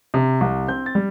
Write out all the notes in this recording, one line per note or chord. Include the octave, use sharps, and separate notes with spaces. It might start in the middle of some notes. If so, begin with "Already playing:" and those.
C3
C2
C4 G6
A6
G3